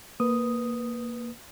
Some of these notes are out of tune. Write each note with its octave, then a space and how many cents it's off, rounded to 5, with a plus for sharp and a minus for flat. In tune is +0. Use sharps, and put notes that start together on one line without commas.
A#3 +0 B4 +0 D#6 +0